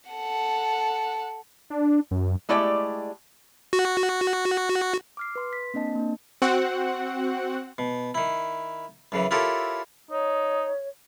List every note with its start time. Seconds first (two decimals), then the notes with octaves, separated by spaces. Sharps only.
0.10 A4 F#5
1.70 D4
2.11 F#2
2.49 G#3 A3 E4 G4 D5 G5
3.73 F#4
5.17 D6 F6 C7
5.36 B4 C6
5.53 B6
5.74 A#3 C4 D4 D#5 A5
5.95 A#3 D4
6.42 C4 F#4 F#5
7.78 B2
8.15 D#3 E4
9.12 F#2 C#3 E3
9.31 E4 F4 G4 A4 A#4 C#5
10.11 D#4 C#5